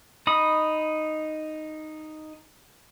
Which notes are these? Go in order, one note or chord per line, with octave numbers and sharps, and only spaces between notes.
D#4 B5 D#6